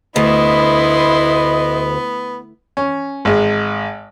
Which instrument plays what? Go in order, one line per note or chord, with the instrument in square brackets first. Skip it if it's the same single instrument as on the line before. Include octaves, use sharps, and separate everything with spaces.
[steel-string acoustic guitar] D2 [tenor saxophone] B3 [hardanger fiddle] E4 C6 [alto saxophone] D#5
[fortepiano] C#4
G#1 G#3